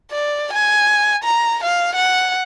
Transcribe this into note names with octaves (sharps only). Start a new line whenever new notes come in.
D5
G#5
A#5
F5
F#5